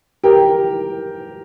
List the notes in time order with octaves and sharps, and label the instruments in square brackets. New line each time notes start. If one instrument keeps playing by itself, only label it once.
[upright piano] G4 A#4